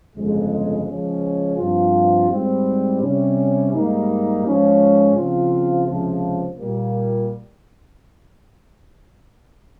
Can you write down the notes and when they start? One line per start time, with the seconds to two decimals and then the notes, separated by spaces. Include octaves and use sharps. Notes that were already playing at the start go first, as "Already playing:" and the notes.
0.14 G1 F2 C#3 G#3
0.86 C#3 F3 G#3 C#4
1.58 G2 F3 C4 F4
2.28 G#2 G3 C4
3.00 C3 G3 C#4
3.72 G#2 G3 A#3 D#4
4.44 G#2 F3 G#3 C#4
5.16 C#3 F3 C4 F4
5.87 C#2 C3 F3
6.58 A#2 G3 A#3